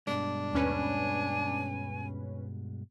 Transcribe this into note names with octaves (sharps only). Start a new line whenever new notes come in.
G2 B2 G#3 D4
D#2 C#4 B4 G#5